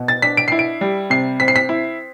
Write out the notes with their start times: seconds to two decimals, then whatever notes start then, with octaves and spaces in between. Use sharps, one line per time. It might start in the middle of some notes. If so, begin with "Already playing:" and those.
Already playing: B2 B3
0.08 A6
0.22 D4 B6
0.37 D7
0.48 E4 C7
0.59 D7
0.81 G3
1.10 C3 C7
1.40 C4 B6
1.48 C7
1.56 B6
1.69 E4